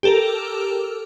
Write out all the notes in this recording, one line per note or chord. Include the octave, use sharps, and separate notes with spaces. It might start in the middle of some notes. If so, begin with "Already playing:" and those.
G4 A4 A#4